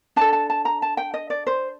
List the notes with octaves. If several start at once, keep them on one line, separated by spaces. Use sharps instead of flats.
D4 A4 A5
A5
A5
A#5
A5
G5
D#5
D5
C5